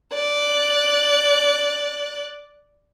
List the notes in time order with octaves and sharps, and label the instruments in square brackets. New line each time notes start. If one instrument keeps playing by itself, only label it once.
[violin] D5 F#6